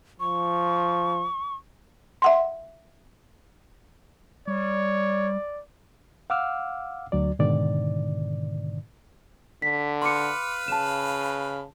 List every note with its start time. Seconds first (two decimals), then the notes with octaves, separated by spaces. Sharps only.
0.20 F3 C#6
2.22 E5 F#5 C6
4.48 G3 C#5 D5
6.30 F5 F#5 D6 E6 F6
7.12 D2 F#3 D5
7.39 G#2 B2 D3 D#3 D5
9.62 D3 B6
10.02 B4 F5 B5 C6 D6 C#7
10.68 C#3 A5 E7